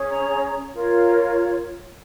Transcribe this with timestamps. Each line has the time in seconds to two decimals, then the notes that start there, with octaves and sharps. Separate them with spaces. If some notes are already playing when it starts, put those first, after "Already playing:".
Already playing: C#4 G#4 C#5
0.08 A#5
0.74 F4 A#4 C#5